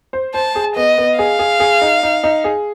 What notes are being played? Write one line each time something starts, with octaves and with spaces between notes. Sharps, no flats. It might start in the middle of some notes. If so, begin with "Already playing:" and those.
C5
C5 A5
G#4
B3 D#5
B3
G#4 F5
G#4
G#4
D#4
D#4
D#4
G#4